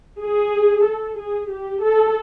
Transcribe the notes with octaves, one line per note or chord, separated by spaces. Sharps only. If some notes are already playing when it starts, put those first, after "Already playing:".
G#4
A4
G#4
G4
A4